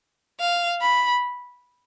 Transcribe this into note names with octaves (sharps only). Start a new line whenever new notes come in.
F5
B5